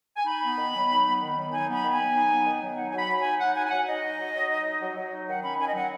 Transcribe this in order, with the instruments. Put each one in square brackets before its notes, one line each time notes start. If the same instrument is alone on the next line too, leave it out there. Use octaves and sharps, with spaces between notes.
[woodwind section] G#5
D#4 B5
B3
D#3
F#3
D#4
B3
D#3
F#3
D#4 G#5
B3 B5
D#3
G#5
F#3
D#4
B3
D#3
F#3
D#4 F#5
F#3 G#5
B5
F#3
G#5
D#4
D#4 F#5
F#3 G#5
G#5
F#3 F#5
D#4 D#5
D#4
F#3
F#3
D#4
D#4
F#3
F#3
D#4
D#3 F#5
C#4 B5
D#3 G#5
D#5
F#3 F#5